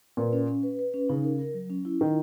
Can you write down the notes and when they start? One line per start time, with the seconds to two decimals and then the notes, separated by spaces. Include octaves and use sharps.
0.17 A#2 B4
0.33 C#4
0.48 C#4
0.63 B4
0.79 B4
0.94 C#4
1.09 C#3 D#4
1.24 A#4
1.39 A#4
1.54 F#3
1.70 C#4
1.85 E4
2.00 D#3 E4